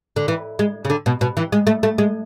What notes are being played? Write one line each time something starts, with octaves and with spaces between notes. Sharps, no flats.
D3
E3
G#3
C#3
D3
B2
B2
E3
G#3
A3
A3
G#3